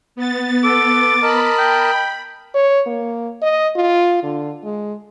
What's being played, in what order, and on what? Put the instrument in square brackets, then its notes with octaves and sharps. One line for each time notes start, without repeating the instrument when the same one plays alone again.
[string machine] B3 A6
[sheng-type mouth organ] A4 [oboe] D6
[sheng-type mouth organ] A#4 D#5 A5 [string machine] B5
[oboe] G5
[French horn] C#5
A#3
D#5
F4
D3
G#3